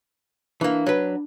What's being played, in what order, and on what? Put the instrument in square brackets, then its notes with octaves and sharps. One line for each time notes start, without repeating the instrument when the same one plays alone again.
[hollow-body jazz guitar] E3 A#3 [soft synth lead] D4
[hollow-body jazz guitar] F#3 B4